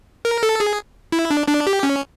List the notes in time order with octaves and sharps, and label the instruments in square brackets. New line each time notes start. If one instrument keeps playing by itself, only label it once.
[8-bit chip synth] A#4
A4
G#4
E4
D4
D4
G4
C#4